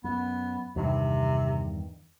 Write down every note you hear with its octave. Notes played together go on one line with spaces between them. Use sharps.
F#2 B3
E2 G2 C3 D#3